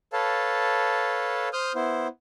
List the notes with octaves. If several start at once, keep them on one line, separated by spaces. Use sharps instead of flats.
A4 B4 C#5 F5 A5
C5 D#6 F6 G6
B3 E4 C5